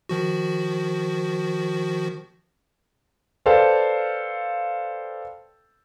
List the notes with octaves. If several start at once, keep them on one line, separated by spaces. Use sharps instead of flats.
D#3 F3 F#4
A4 B4 C5 D5 F5 G5